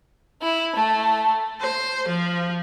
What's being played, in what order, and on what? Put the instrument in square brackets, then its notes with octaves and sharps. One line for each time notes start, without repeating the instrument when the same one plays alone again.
[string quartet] E4
A3
C5
F3